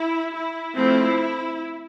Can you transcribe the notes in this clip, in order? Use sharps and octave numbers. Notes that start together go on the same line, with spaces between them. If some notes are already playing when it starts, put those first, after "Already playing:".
Already playing: E4
E4
F3 A3 C4 E4